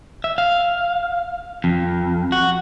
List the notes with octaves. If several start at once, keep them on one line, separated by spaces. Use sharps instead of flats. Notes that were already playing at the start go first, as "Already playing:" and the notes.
E5
F5
F2
F#4